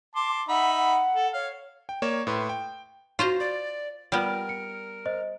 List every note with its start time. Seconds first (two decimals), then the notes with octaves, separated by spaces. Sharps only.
0.15 A5 C6 D6
0.49 D#4 E5 F#5 B5
0.77 F#5
1.15 A4
1.33 C#5 F5
1.89 G5
2.02 A#3 C#5 D5 E7
2.27 A2 B4 C6
2.49 G5
3.19 F4 F#4 C5 A#5 C#6
3.40 D5 A6
4.12 G3 B3 F4 A#4 F6 D7
4.49 C#7
5.06 C5 D#5